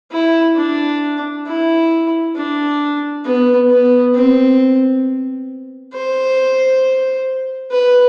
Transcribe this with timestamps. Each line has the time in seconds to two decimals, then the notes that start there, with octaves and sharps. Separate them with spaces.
0.12 E4
0.57 D4
1.47 E4
2.36 D4
3.25 B3
3.70 B3
4.14 C4
5.93 C5
7.72 B4